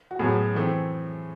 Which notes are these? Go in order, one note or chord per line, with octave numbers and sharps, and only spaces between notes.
F#4
A2 F#3 B3 G#4
E3 A3 C4